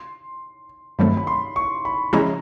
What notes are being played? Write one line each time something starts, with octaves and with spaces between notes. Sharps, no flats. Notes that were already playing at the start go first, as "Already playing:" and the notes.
Already playing: C6
G2 D#3 F#3 A3 C4 B5
B5
C6
C#6
B5
C#3 F3 G#3 C#4 E4 A#5